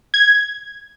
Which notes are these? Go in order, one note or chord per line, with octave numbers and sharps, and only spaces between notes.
G#6